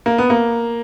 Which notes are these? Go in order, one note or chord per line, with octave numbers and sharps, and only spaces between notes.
A#3
B3
A#3